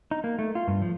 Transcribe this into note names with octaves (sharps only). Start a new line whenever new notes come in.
D#4
A#3
A3
F4
G2
F3